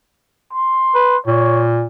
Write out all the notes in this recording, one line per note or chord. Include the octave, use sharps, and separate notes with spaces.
C6
B4
A#2 C#5